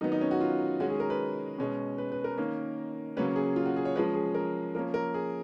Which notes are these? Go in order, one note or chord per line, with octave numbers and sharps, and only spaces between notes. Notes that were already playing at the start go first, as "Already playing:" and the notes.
D#3 F#3 B3 D#4
D#4
C#4
F#4
F4
D#3 G#3 C#4 F#4
G#4
A#4
B4
B2 G#3 C#4
B4
B4
A#4
D#3 A#3 C#4
C#3 F#3 A#3 C#4 B4
G#4
F4
F#4
G#4
C#5
F3 G#3 C#4 B4
G#4
A#4
F3 A#3 C#4 A#4
A#4
G#4